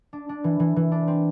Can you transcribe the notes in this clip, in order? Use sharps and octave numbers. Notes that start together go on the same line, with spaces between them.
D4
D4
E3
E3
E3
D4
C4